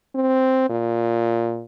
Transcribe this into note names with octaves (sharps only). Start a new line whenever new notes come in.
C4
A#2